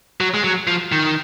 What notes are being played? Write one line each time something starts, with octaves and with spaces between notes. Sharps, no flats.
F#3
G#3
F#3
F3
D#3